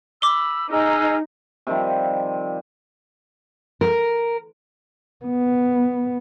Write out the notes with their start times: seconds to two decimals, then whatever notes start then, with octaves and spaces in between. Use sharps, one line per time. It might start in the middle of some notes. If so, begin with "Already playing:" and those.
0.22 B5 D6 E6 G7
0.70 D#4 G#4 E6 F6
1.67 C3 D#3 F3 G3
3.81 A#4
5.25 B3